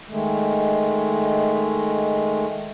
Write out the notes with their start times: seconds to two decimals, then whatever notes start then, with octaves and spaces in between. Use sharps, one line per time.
0.09 D#3 G#3 A3